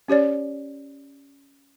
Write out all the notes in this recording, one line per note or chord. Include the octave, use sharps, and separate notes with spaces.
C#4 G4 C#5 D5